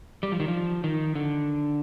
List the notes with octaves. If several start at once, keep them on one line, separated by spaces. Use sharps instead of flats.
G3
F3
D#3
F3
D#3
D3